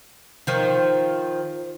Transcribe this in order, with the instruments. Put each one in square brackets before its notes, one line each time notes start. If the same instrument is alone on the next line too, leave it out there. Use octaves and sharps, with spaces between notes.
[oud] D#3 F3